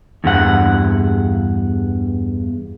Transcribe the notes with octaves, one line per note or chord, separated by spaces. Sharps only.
E2 G2 F#5